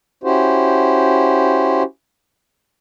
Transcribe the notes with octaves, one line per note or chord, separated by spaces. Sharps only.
C#4 E4 F#4 G4 C5